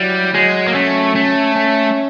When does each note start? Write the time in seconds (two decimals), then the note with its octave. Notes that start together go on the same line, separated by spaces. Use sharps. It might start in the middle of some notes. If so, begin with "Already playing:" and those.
Already playing: F#3 G3 E4
0.34 F#3 G#3
0.67 A#3
0.74 A3 C#4
1.15 A3 C#4
1.55 C#4